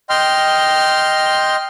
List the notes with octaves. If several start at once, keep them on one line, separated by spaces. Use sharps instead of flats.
D#5 G5 C6 F6